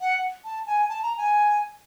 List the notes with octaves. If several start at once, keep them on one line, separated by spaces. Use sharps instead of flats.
F#5
A5
G#5
A5
A#5
G#5